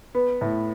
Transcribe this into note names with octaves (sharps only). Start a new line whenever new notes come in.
B3
A2